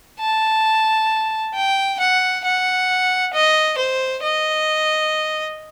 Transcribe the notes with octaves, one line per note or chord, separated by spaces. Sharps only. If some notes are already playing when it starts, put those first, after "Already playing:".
A5
G5
F#5
F#5
D#5
C5
D#5